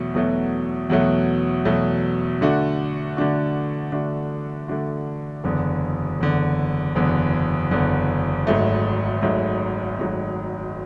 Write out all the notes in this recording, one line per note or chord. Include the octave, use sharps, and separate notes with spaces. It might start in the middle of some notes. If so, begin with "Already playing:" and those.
Already playing: E2 B2 F#3 A3
E2 B2 F#3 A3
E2 B2 F#3 A3
E2 B2 F#3 A3
D3 A3 D4 F#4
D3 A3 D4 F#4
D3 A3 D4 F#4
D3 A3 D4 F#4
F#1 E2 D3
F#1 E2 D3
F#1 E2 D3
F#1 E2 D3
G#1 G#2 F#3 A3
G#1 G#2 F#3 A3
G#1 G#2 F#3 A3